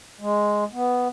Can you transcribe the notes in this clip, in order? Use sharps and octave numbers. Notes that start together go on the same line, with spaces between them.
G#3
B3